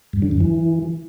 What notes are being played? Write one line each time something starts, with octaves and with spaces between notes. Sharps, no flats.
G2
D3
F#2
E3